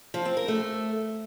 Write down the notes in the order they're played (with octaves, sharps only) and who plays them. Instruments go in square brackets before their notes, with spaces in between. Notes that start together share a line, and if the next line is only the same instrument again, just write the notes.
[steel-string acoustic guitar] F3
C4
A#4
A3